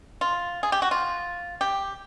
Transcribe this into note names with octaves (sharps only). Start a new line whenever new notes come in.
F4
G#4
G4
F#4
F4
G4